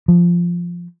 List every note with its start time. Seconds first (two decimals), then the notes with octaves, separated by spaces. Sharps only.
0.08 F3